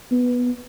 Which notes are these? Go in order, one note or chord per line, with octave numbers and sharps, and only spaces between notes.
B3